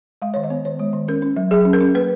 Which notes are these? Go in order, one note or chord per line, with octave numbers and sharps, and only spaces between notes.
G#3 F5
D#3 C#5
D#5
B3
D#3 C#5
G#3
D#3
C#4 A#4
C#4
F#3
F#3 G#4
C#4
A#4
C#4
A#3 B4